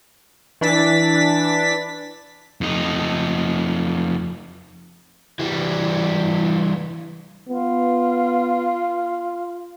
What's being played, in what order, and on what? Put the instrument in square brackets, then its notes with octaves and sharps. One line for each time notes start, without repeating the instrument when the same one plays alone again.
[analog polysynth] E3 D4 A6 B6
[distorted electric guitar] F2 D#4
[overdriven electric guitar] E3 G3
[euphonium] B3 [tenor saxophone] F4